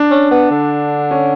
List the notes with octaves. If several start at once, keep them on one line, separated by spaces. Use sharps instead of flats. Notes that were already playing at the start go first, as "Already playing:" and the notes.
Already playing: D4
C#4
B3
D3
C#4